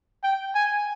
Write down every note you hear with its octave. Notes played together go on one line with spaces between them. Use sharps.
G5
G#5